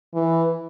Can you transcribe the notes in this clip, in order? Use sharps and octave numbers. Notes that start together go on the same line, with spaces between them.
E3